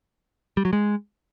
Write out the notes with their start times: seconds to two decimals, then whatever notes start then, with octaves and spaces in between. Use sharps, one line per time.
0.57 G3
0.65 F#3
0.73 G#3